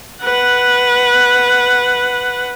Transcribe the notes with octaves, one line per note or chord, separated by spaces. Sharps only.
B4 F#5